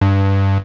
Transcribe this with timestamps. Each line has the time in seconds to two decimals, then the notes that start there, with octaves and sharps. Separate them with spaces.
0.01 G2